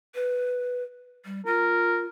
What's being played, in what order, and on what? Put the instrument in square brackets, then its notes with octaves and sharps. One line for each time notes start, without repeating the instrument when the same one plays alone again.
[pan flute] B4
G3
[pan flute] F4 [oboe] A#4